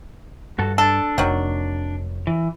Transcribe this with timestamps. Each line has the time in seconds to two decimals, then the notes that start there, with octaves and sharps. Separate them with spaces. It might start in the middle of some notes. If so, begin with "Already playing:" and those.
0.59 G2 F#4 A4
0.78 D4 A4
1.18 F1 D#3 F#3
2.27 E3